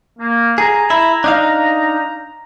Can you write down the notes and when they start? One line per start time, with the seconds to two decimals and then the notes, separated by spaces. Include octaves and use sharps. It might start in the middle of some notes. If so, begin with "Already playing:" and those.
0.19 A#3
0.58 G#4 A#5
0.90 E4
1.24 D4 D#4 F5